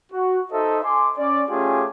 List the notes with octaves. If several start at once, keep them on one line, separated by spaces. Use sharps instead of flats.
F#4
D#4 A4 C5 D#5 E5
G#5 C6 D6
C#4 D5
A3 C#4 F4 G4 G#4 D6